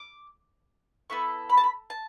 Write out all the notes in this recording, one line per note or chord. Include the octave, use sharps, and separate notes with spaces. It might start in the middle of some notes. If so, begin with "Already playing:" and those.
Already playing: D6
B3 E4 A4 C#6
B5
A5
B5
A5